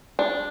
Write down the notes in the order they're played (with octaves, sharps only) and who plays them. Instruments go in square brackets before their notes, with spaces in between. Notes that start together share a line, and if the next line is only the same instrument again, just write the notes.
[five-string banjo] D4